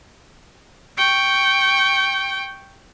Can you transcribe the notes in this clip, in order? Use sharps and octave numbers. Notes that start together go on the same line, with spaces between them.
G5 C#6